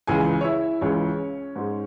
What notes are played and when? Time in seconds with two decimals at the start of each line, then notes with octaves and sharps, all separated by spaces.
0.07 C#2 C#3 E3 G#3 G#4 G#5
0.41 C#5
0.44 E4 E5
0.81 C#2 C#3 E3 G#3 C#4 C#5
1.55 G#2 G#3